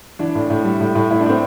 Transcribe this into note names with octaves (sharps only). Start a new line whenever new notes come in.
E3 D4
A2
A2
G3
A2
A2
A2 E4
D4
A2 C4